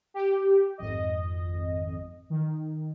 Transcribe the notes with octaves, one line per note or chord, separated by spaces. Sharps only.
G4
G#1 F2 D#5
D#3